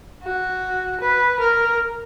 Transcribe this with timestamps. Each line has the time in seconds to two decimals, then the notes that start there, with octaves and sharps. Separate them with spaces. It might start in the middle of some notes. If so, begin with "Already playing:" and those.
0.24 F#4
1.01 B4
1.40 A#4